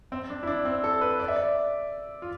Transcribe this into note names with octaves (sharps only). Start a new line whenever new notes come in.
C4
D4
E4
D4
C4
A4
B4
D5
E5
D5
F4